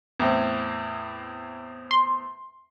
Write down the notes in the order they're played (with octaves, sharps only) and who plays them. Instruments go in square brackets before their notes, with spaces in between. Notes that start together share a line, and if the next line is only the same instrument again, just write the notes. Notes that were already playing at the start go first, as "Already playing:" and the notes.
[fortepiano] E2 A2 C4
[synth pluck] C6